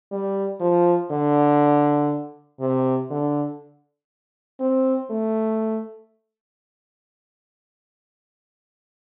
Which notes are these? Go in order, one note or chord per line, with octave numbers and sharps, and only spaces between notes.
G3
F3
D3
C3
D3
C4
A3